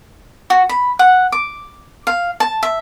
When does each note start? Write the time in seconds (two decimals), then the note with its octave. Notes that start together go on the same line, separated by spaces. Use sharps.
0.50 F#4
0.69 B5
0.99 F#5
1.32 D6
2.07 F5
2.40 A5
2.63 E5